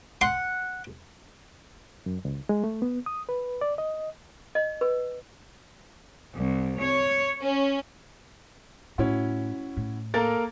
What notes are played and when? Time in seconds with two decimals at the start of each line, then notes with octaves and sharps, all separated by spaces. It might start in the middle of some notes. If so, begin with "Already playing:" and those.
0.21 F#5 C6
2.06 F#2
2.25 C#2
2.49 G#3
2.64 A3
2.82 B3
3.06 D#6
3.29 B4
3.61 D5
3.78 D#5
4.55 D#5
4.81 B4
6.34 C2
6.81 C#5
7.41 C#4
8.98 A2 C#4 E4 F#4
9.77 A2
10.14 A#3 A4 A#4 A6